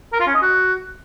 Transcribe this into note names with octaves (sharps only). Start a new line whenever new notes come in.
A#4
F4
C#4
D#5
F#4